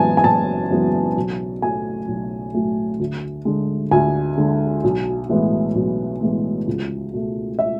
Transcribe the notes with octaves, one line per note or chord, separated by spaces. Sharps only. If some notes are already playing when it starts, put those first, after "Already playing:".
Already playing: F#1 F#2 E3 G#3 B3 G#5 A5
G#5
F#1 A5
F#2 E3 G#3 B3
B1
A2 F#3 A3 G#5
B1
A2 F#3 A3
D2
D3 G#3
D2 G#5
D3 G#3
B1
A2 E3 G#3 B3
B1
A2 E3 G#3 B3
C#2
B2 A3
E5